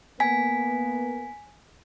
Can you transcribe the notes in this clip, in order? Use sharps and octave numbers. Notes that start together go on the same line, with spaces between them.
A#3 B3 G#5 B6